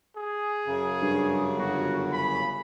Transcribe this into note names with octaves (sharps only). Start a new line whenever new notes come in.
G#4
F#2 C#3
G2
G1 F#4
B5